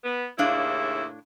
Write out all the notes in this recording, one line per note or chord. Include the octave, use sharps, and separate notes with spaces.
B3
D#2 A2 C#3 D4 E4 F5